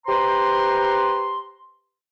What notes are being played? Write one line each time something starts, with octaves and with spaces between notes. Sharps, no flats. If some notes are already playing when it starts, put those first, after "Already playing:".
G4 B4 C5 A#5 C6